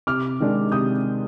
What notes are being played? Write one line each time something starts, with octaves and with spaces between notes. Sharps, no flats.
C3 D6 F6
D#3 G#3 D4
C3 D#6 G6